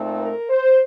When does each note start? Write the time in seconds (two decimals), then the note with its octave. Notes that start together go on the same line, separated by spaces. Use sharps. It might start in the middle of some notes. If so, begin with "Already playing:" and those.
Already playing: A#2 A3 C4 D#4
0.20 A#4
0.49 C5